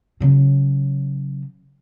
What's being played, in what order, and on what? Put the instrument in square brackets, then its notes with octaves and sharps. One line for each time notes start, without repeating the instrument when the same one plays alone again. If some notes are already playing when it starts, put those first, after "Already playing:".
[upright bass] C#3 F#3